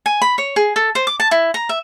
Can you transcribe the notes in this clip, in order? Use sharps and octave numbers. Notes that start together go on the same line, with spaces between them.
G#5
B5
C#5
G#4
A4
C5
D6
A5
E4
A#5
E5